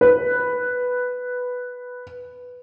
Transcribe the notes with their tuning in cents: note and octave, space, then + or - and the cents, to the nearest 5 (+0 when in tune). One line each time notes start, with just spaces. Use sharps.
B4 +0